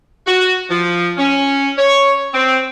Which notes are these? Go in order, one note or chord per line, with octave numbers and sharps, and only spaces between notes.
F#4
F3
C#4
C#5
C4